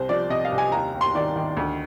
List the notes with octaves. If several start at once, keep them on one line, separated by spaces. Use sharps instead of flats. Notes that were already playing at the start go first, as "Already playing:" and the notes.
Already playing: C2 C5
F3 D5
C3 D#5
F5
C2
G#5
D#2 A#5
D#2
C6
D#3 D5
D#3
D2